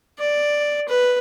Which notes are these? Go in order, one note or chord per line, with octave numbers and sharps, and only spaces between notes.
D5
B4